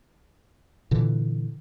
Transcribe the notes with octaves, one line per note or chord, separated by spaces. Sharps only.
A#2 D3 E3